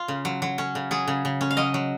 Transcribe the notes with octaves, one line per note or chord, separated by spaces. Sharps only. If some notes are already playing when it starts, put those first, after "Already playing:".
Already playing: F4
C#3
F#3
F#3
C#4
C#3
F#3 G#4
C#3
C#3
C#4
F5
F#3 D#5
F#3